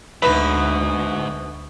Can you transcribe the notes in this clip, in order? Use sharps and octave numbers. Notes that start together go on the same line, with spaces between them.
D2 G#2 B2 D#4 B4 E5